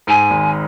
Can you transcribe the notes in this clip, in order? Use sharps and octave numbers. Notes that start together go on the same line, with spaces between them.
G#2 G#5
G#1